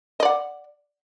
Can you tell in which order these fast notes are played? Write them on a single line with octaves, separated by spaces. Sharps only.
D#5 D5 F#5